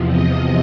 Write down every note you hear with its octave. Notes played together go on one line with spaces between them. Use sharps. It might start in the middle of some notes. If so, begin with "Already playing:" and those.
Already playing: E2 C3 F3
D#5